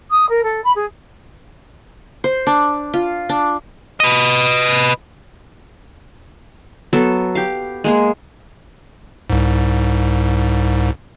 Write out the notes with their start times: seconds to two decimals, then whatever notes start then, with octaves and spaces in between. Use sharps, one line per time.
0.10 D#6
0.29 A#4
0.43 A4
0.64 B5
0.75 G#4
2.24 C5
2.47 D4
2.94 F4
3.29 D4
4.00 B4 D#5
6.93 F#3 B3 A4
7.35 G4 F5
7.84 G#3 A#3 G#4
9.30 C2 G#2